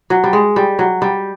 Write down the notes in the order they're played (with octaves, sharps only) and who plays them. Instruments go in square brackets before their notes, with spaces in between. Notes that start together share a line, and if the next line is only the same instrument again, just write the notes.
[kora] F#3
G3
G#3
G3
F#3
G3